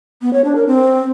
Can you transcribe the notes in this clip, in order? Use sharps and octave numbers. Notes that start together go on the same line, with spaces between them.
B3
C#5
D4
A#4
C4